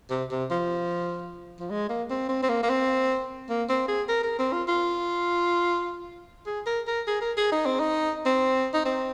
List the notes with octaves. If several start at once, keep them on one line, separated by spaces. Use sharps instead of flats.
C3
C3
F3
F3
G#3
A#3
C4
C4
C4
A#3
A#3
C4
A#3
C4
G#4
A#4
A#4
C4
F4
F4
G#4
A#4
A#4
G#4
A#4
G#4
D#4
C4
D#4
C4
D#4
C4